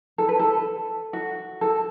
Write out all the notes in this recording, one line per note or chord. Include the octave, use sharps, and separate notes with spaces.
A4
B4
A4
F#4
A4